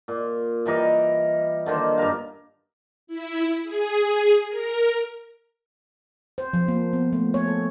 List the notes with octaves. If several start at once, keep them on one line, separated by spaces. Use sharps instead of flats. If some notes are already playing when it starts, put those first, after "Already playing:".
A#2
E3 G3 A#4 D#5
D3 D#3 A#3 C5
G2 G4 A#4 F5
E4
G#4
A#4
C5
F3
A#3
B3
A3
C#5
A4